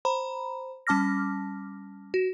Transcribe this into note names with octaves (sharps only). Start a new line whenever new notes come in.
C5 A#5 B5
G3 C#4 A5 D6 F6 A#6
F#4